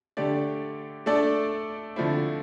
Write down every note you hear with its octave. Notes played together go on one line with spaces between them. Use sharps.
D3 A3 D4 G4 D5
A3 D4 A4 D5
D3 F3 A3 C4 E4